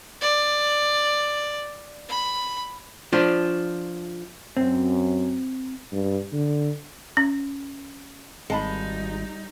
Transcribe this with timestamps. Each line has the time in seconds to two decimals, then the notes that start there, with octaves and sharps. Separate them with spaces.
0.21 D5
2.09 B5
3.13 F3 D4 F4
4.57 F#2 C4
5.92 G2
6.32 D3
7.17 C#4
8.50 G#1 G3 G#3 D#4 F5 A5 B5